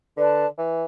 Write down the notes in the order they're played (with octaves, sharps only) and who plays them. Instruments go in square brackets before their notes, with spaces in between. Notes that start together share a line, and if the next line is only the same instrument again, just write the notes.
[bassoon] D3 [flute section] B4 D5 A5
[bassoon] E3